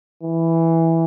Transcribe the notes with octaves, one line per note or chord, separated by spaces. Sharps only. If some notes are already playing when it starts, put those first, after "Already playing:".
E3